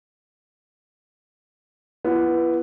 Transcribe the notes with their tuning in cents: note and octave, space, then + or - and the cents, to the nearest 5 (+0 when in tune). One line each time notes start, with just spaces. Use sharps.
B3 -5 E4 +40